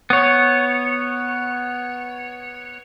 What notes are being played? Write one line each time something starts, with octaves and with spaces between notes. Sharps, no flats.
B3 C#5